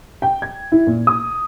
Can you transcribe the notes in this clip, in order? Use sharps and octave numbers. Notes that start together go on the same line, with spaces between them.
G5
G#6
E4
A#2
D#6